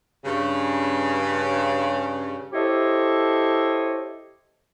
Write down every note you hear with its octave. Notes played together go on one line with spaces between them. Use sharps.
G2 C#3
E4 G4 A4 C5 C#5 D#5